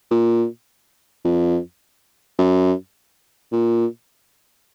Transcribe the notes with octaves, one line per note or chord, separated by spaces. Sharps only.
A#2
F2
F#2
A#2